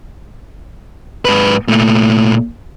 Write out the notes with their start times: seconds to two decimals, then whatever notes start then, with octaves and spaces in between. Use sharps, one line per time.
1.25 G#2 B4
1.68 A#2 A3